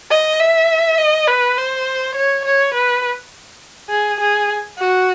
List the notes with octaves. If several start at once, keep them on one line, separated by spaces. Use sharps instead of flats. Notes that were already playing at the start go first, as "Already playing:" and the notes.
D#5
E5
D#5
B4
C5
C#5
C#5
B4
G#4
G#4
F#4